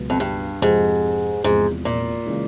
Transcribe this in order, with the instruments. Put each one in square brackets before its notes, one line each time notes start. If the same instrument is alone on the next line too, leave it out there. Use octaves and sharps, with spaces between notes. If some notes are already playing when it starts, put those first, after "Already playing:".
Already playing: [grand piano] C#2 B2 F#3 B3
[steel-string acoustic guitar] F2
G2
[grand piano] F2 C3 F3 G#3 C4 [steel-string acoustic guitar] G#2
[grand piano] E2 C3 F3 G#3 [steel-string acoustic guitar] G#2
[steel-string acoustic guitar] A#2
[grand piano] C#3 E3 G#3 C#4